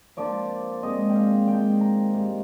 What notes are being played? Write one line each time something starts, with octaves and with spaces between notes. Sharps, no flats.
F3 A#3 D4 F4 D5
A#2 G#3 C4 D#5
G5
F5
D#3 G#3 D4 F4 G5
A#5
G#2 G3 A#3